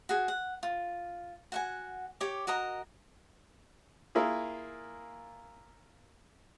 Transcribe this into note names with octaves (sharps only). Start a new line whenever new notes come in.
F#4 G#4
F#5
F4
F#4 F#5 G#5
G4 C#5 D6
F#4 A#4 D#5 A#5
A#3 E4 F4 G#4